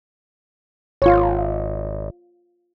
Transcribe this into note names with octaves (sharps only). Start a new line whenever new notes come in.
G#1 F4 C#5